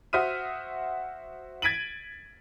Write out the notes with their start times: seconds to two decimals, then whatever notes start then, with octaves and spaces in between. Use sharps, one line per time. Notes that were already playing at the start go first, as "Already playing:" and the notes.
0.13 F#4 C5 E5 D#6 F6 D#7
1.62 G#6 A6 B6 D7 D#7 F#7